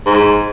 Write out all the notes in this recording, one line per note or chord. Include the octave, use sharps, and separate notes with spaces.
G#2